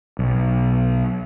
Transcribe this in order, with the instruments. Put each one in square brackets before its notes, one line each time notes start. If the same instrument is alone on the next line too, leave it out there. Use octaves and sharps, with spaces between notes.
[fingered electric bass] B1